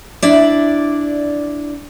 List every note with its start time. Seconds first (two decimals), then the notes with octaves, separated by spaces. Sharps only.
0.22 D4 E4 D5